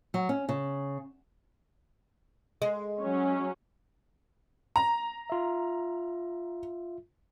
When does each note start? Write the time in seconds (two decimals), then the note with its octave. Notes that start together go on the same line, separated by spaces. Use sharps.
0.14 F#3
0.29 C#4
0.49 C#3
2.62 G#3
3.00 F#3 C#4
4.76 A#5
5.30 F4 E5